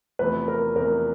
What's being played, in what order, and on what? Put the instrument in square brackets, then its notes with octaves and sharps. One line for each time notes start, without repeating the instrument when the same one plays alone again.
[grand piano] E2 C3 F3 A3 [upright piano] B4
[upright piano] A#4
[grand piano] E2 C3 F3 A3 [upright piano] A#4